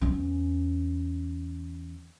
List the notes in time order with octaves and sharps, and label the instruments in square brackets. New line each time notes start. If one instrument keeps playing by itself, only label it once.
[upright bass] E2 C#4